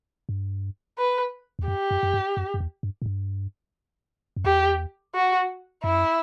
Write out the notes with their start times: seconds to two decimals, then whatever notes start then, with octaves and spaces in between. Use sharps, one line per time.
0.29 G2
0.98 B4
1.59 E2
1.67 F#2 G4
1.91 F#2
2.03 F#2
2.13 G2
2.37 F#2
2.54 F#2
2.60 E2
2.83 G2
3.02 A2
3.06 G2
4.36 F#2
4.44 E2 G4
5.15 F#4
5.84 F#2 E4